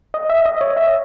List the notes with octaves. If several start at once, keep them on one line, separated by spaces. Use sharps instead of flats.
D#5
E5
D#5
C#5
E5